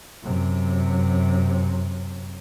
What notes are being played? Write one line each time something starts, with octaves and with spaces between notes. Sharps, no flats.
F#2 C3